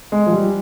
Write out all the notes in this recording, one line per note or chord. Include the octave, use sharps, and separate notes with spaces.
G#3
F3
G3